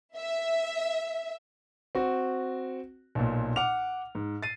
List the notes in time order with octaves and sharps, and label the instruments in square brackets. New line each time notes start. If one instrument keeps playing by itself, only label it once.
[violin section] E5
[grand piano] C4 F#4
B1 A#2
F#5 D6 F6 F7
G#2
A6 C7 D#7